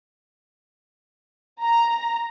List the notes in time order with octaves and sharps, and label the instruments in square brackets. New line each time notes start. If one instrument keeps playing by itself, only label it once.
[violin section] A#5